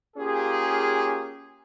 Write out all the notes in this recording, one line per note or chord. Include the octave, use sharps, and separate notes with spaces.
A#3 C#4 F4 G4 G#4